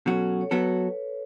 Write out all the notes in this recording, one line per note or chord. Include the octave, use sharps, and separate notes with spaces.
B2 F#3 C#4 F#4 A4
C#5
F#3 B3 F#4 A4 B4